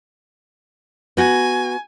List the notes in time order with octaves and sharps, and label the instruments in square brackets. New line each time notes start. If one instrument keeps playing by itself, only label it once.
[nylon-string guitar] B3 F#4 [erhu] G#5